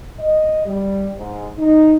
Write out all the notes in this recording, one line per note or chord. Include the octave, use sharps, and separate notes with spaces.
D#5
G3
G#2
D#4